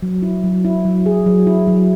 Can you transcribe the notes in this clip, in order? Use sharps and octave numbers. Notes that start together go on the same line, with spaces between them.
F#3
E4
F#3
E4
F#3
G#4
F#3
E4
F#3